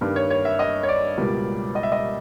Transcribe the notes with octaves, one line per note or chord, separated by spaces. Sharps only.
G2 D#3 G3 A#3
C#5
C#5
E5
D#5
C#5
D5
C#2 B2 G3 A#3
D#5
E5
D#5